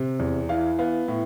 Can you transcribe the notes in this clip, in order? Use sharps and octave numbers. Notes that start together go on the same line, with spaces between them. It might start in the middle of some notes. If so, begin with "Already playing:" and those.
Already playing: C3
E2
E3 F5
B3 F5
A2